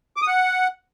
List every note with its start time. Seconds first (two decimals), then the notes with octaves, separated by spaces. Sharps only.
0.17 D6
0.22 D#6
0.27 F#5